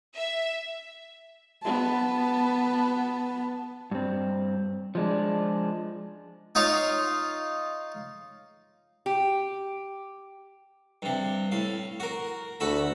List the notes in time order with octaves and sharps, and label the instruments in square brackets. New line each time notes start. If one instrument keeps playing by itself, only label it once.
[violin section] E5
[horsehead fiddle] B3 A5
[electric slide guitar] G2 C4
F3 G#3 D4
[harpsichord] D#4 F4 C#5 F5
[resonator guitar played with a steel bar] G4
[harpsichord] G2 C3
A2 F5
F#4 A#4
[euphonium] D2 [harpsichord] F#4 A4 B5